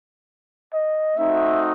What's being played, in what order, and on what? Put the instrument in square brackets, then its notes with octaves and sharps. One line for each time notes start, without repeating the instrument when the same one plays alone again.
[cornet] D#5
[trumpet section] A3 C4 D#4 F#4 [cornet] E5